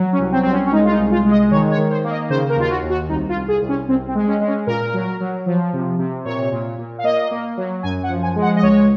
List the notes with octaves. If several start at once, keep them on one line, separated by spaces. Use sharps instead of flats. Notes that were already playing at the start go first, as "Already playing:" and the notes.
Already playing: F#3
C#4
C2
C4
C2 C4
C#4
C#4
G#3 D#4
F4
D#4
C2
F4
G#3
D#5
D#3 C#5
C#5
D#3
C5
A#3
D#5
C#3 C5
A#4
D#2 F4
F#4
D#2
F#4
C2 D#4
F4
C2
G#4
C2
C#4
C2 C4
C4
G#3
C#4
G#3
C#4
A#2 A#4
F#3
F#3
F3
C3
C3
A#2 C#5
A#2
A#2
F5
A#3 D#5
A#3
F#3
F#2 G#5
F#5
F3
G#5
G#3
F#5
D#5
C#2 C#5